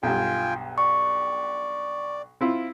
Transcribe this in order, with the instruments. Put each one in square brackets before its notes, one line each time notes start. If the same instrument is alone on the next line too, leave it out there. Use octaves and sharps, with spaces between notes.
[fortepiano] B1 G2 [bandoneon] F4 G5 G#5
[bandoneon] D5 [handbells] C#6
[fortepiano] C4 E4 F4